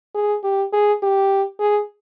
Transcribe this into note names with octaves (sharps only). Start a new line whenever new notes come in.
G#4
G4
G#4
G4
G#4